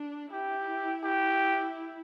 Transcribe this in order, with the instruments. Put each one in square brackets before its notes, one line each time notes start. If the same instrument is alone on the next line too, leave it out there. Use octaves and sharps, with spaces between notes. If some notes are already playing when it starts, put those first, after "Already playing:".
Already playing: [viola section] D4
[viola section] E4 [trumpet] G4
[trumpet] G4